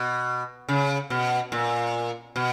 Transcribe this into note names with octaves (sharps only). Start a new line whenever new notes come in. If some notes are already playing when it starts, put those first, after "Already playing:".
Already playing: B2
C#3
B2
A#2
B2